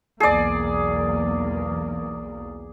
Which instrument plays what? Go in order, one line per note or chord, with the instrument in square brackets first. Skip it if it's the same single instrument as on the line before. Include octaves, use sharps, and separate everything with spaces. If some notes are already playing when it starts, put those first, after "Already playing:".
[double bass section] B1 E2 A#3 [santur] G#4 D5